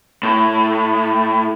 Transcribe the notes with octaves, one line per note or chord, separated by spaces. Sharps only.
A2